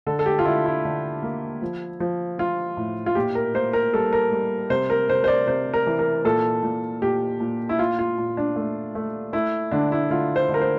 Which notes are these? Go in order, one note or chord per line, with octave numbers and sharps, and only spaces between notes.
D3 A4
A4
G4
F4
D3 E4
E4
D3
A#3
F3
F3
F3 F4
A2
F4
A#2 G4
A#4
A#3 C5
A#4
G3 A4
A#4
G3
C3 C5
A#4
C3 C5
C5
D5
C3 C5
A#4
E3
A#4
A#2 A4
A#2
A#2 G4
A#2
E4
A#2 F4
F4
A#2
D4
A3
A3
A3 E4
D3 D4
E4
D3 F4
C5
D3
A#4
C5